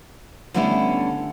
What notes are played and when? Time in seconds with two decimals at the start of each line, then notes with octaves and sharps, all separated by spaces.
0.54 D3 G3 A3 B3 C#4 E4